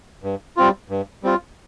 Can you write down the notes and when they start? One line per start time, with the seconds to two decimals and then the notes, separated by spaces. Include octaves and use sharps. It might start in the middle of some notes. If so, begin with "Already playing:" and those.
0.24 G2
0.57 G3 C4 F4
0.90 G2
1.23 G3 C4 F4